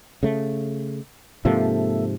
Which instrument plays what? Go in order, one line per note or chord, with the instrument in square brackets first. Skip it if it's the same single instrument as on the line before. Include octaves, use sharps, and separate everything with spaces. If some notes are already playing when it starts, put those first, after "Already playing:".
[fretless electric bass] C#3 A3
[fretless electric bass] G#2 C3 F3 [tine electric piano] A#3 A4 E5